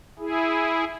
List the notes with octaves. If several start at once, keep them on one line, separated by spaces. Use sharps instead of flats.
E4 G#4